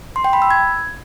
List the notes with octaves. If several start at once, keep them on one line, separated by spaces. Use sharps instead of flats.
C6
G5
B5
E6
G#6